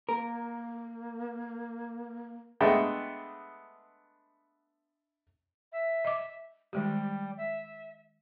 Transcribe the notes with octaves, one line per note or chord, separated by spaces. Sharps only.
A#3 A#4
G#3 A3 B3 D4 E5 G5
E5
D#5 D6
D#3 G3 G#3 G4
E5